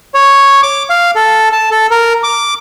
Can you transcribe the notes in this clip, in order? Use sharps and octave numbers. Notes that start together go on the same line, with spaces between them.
C#5
D6
F5
A4
A5
A4
A#4
D6